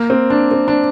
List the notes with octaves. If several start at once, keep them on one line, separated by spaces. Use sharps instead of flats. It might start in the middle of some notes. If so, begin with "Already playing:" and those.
Already playing: A#3
C4
D4
C4
D4